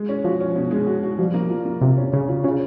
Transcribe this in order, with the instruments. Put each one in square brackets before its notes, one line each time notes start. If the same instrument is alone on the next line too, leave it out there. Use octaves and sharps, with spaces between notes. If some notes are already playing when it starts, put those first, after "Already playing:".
Already playing: [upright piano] G#3
C#4
[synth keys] F3 [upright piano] F#4
[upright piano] C#4
B2
G#3
F#4
F#4
[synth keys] F3 [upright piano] G3
[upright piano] A#3
F4
A#3
[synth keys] C3 [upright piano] F4
[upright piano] C#4
[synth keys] C#3 [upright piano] C#4
[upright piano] F4
[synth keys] C#3 [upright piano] F4